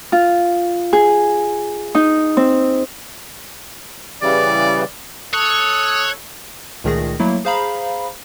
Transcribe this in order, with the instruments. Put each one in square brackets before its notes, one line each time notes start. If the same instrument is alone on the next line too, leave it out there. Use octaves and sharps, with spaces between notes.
[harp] F4
G#4
D#4
C4
[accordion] C#3 E3 G3 [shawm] D5
[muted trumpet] A4 [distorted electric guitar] C#5 [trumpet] D#6 [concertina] F#6
[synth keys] C#2 A#2 D#3 A3 G#4 A#6
F#3 G3 A3 A#3 E4
G#4 C5 F5 A#5 B5